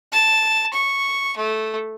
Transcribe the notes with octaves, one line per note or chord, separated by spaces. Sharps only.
A5
C#6
A3